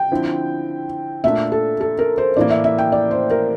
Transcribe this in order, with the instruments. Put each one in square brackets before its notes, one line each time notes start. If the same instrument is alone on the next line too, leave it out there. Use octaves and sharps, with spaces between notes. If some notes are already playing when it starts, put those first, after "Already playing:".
Already playing: [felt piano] G5
[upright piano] D3 F3 C4 E4
[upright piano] A#2 A3 D4 [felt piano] E5
[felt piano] A4
A4
A#4
C5
[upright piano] A2 E3 A#3 [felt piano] D5
[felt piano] E5
E5
G5
D5
C5
A#4